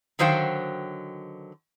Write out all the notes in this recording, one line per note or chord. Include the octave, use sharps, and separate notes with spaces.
D3 D#3 F#3 C5 F5 G5